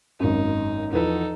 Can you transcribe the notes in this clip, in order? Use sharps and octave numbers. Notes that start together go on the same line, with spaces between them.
G#1 F#2 D#4
E2 F3 D#4 A4 B4